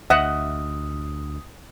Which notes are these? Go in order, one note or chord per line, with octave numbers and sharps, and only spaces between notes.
D2 D#5 E5 F#5 D#6